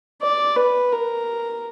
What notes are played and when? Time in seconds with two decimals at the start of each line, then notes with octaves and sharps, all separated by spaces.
0.22 D5
0.57 B4
0.92 A#4